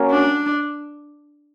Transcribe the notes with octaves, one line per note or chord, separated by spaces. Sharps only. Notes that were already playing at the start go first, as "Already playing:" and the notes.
Already playing: A#3 C#4 F#4 A#4 C#5
D4